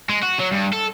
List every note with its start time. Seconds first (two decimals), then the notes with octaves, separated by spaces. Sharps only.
0.09 G#3
0.23 F#4
0.39 F#3
0.52 G2
0.73 A4